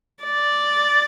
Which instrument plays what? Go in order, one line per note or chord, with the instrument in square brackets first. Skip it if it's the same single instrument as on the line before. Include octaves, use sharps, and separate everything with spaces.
[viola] D5